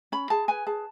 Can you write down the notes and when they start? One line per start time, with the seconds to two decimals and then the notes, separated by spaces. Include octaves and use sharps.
0.12 C#4 B5
0.30 G#4 A5
0.48 B4 G#5
0.67 G#4 A5